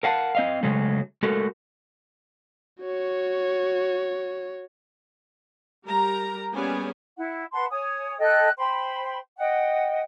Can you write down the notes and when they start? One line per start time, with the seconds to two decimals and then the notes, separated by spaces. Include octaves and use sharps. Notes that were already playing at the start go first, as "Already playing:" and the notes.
0.03 A#4 F5 F#5 A5
0.35 C4 D#5 F5
0.63 C#3 F#3 G#3 A3
1.23 G#3 A3 F#4 A4 A#4
2.82 F#4 C#5
5.85 G3 G4 A#4 A#5
6.53 G3 A#3 B3 C#4 G#4 G#5
7.17 E4 F#5
7.52 B4 F#5 A5 C6
7.70 C#5 G#5 D#6
8.20 A4 D#5 G5 F#6
8.57 C5 G5 B5 C6
9.38 D#5 F#5 G5